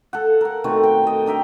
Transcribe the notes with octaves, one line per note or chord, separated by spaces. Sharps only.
A4 F#5
A#4 F#5
B2 D#3 A3 C4
G5
A4 D#5
D4 A#4 E5 G5